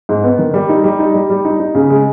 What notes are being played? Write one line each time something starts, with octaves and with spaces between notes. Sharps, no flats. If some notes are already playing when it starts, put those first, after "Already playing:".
G#2
B3
D#3
G3
D#4
G3
D#4
G3
G3
D#4
D#4
C#3
G#3